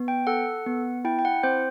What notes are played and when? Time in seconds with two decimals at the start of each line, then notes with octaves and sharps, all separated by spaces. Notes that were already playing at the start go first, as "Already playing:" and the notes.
Already playing: B3
0.08 G5
0.27 A4 F#5
0.67 B3
1.05 E4 G5
1.19 G5
1.25 F#5
1.43 C4 C5